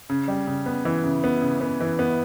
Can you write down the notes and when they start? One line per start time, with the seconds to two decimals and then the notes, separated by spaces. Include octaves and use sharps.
0.09 C#3
0.28 G3
0.47 C#3
0.66 B3
0.85 E3
1.04 C#3
1.24 B3
1.42 C#3
1.61 B3
1.81 E3
1.99 B3